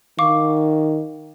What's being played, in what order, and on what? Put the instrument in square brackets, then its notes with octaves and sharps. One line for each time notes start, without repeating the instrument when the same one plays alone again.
[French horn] D#3 [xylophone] F5 C#6 D6